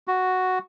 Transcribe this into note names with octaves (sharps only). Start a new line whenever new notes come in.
F#4